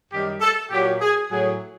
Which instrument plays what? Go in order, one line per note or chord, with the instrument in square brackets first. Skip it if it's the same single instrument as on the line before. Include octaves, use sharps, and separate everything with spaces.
[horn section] F#2 D#3 G3 G4
A4
A#2 F#3 G4
G#4
A2 F#3 G#4